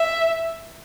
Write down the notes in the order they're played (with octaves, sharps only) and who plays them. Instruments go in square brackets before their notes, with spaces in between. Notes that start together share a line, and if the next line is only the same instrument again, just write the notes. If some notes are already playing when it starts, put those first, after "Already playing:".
Already playing: [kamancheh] E5